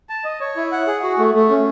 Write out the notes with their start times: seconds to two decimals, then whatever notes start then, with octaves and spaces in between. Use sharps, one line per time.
0.09 A5
0.24 D#5
0.40 C#5
0.56 E4
0.72 F#5
0.87 G#4
1.03 F#4
1.18 A3
1.34 A3
1.50 C#4